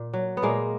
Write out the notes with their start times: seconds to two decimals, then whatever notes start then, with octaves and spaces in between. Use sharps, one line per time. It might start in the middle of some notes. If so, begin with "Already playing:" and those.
Already playing: A#2
0.14 F#3
0.37 B3
0.42 A#2 G#3 A#3